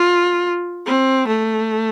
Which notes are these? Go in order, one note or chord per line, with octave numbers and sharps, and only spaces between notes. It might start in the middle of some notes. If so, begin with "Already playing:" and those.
Already playing: F4
C4
A3